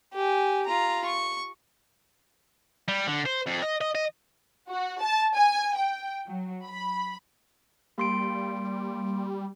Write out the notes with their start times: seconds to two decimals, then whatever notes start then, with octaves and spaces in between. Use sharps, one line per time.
0.14 G4 G#5
0.66 F4 A#5
1.05 C#6
2.88 G3
3.07 D3
3.26 C5
3.47 F2
3.63 D#5
3.81 D#5
3.95 D#5
4.70 F#4
5.01 A5
5.35 G#5
5.76 G5
6.27 F#3
6.65 B5
7.98 G3 A#3 C6 D7